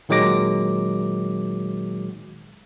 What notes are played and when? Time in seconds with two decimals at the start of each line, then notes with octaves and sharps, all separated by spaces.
0.09 A#2 D#3 F#3 G#3 D6 A#6